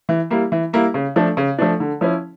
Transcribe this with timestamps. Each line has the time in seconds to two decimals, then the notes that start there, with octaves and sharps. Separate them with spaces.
0.09 E3
0.30 G3 A#3 E4
0.52 E3
0.73 G3 A#3 E4
0.94 C#3
1.16 F3 A3 D4
1.37 C#3
1.58 F3 A3 D4
1.80 D3
2.01 F3 C#4 E4